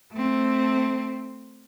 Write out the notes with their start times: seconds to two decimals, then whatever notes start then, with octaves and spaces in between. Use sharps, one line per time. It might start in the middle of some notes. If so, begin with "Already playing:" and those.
0.13 A3 C4